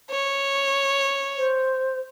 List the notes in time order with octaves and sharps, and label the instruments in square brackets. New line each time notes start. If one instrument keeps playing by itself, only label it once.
[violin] C#5
[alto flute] C5